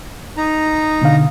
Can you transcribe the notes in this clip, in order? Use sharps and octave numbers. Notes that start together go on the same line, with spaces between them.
D#4 A#5
B2 D3 F5